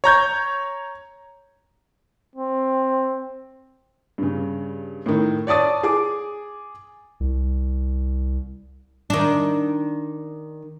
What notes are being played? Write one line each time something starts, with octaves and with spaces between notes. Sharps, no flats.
C#5 A#5 G6 G#6
C4
G2 C#3
A2 D#3
C#5 D5 A5 D#6 A6
G#4 D6
C2
D#3 D4